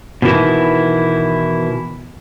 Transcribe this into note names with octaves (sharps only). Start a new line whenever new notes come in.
B2 D#3 E3 E4